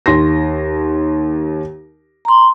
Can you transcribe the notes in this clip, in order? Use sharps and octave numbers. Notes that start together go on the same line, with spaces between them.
D#2 C6 A#6
A#5 C6